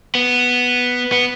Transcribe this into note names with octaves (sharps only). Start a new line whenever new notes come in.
B3
B3